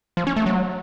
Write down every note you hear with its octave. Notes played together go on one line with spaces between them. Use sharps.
F3
C#4
A3
F#3